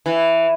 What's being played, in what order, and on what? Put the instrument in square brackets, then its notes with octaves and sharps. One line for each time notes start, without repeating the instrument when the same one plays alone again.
[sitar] E3